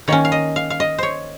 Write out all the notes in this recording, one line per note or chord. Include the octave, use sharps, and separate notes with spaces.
D#3 A#3 C#4 C#5
F5
D#5
F5
F5
D#5
C5 C#5